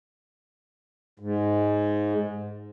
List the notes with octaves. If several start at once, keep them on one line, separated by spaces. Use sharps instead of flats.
G#2